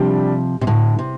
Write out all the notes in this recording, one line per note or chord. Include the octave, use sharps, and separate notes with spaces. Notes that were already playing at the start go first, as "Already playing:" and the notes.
Already playing: C3 F3 G3 D4 G4
C3
A2 D3
C3